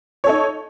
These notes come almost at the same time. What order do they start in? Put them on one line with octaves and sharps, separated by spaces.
C#5 A4 D#4